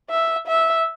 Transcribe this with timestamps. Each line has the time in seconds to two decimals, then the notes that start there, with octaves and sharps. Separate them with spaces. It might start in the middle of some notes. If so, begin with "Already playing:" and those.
0.10 E5
0.48 E5